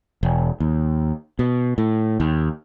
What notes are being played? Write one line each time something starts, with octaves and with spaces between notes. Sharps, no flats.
E1
D#2
B2
A2
D#2